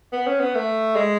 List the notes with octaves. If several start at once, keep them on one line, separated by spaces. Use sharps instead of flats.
B3
C#4
B3
A3
G#3